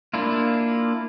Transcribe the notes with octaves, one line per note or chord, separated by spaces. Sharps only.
A#3 D4 E4 F4